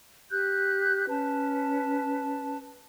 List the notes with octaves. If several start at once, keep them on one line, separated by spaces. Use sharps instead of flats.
G4 F#6 G6
C#4 B4 A5